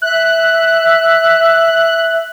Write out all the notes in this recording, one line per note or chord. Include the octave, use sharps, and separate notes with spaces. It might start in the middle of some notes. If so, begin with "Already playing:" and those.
E5 F#6